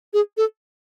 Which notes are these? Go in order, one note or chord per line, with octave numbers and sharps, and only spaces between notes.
G#4
A4